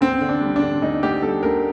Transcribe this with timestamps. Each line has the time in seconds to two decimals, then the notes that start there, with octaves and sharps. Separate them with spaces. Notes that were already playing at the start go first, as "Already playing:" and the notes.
0.01 D2 C4
0.21 D3
0.29 D4
0.41 G3
0.56 D4
0.62 D3
0.82 D2 D#4
1.03 D2 G4
1.22 G3 A4
1.43 D2 A#4